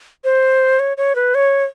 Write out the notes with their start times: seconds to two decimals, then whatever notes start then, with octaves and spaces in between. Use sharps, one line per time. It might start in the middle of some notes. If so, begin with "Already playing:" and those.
0.24 C5
0.79 C#5
0.97 C#5
1.15 B4
1.35 C#5